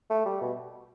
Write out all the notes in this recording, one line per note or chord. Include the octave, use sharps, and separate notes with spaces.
A3
G3
B2